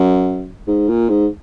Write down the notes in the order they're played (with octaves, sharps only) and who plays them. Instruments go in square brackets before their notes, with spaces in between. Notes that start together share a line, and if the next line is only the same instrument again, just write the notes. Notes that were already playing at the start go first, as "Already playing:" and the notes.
Already playing: [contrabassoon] F#2
G#2
A#2
G#2